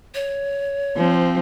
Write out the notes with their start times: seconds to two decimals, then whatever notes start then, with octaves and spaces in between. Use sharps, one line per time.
0.15 C#5
0.97 F3 C4